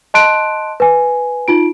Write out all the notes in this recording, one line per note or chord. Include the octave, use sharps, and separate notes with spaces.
D#5 A5 C6 F#6 D7
B4 G#5
D#4 F4 D7